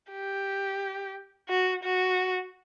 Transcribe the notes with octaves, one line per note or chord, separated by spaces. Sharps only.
G4
F#4
F#4